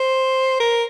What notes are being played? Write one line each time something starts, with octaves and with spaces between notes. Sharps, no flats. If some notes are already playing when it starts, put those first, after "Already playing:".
Already playing: C5
A#4